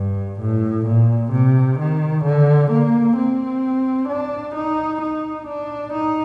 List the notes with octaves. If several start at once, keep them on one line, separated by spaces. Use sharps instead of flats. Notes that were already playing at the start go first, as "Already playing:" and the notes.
Already playing: G2
A2
A#2
C3
D#3
D3
A#3
C4
D4
D#4
D#4
D4
D#4